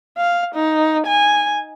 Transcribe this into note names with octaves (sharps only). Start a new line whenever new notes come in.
F5
D#4
G#5